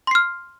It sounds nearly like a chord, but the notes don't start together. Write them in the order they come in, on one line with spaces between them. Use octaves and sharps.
C6 C7 F6